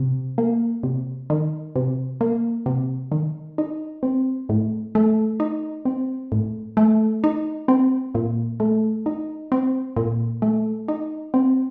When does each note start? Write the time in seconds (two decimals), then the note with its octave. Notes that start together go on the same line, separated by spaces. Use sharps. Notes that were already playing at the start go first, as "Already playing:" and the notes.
Already playing: C3
0.38 A#3
0.83 C3
1.30 D#3
1.76 C3
2.21 A#3
2.66 C3
3.12 D#3
3.58 D#4
4.03 C4
4.49 A2
4.95 A3
5.40 D#4
5.85 C4
6.32 A2
6.77 A3
7.24 D#4
7.68 C4
8.15 A#2
8.60 A3
9.06 D#4
9.52 C4
9.97 A#2
10.42 A3
10.88 D#4
11.34 C4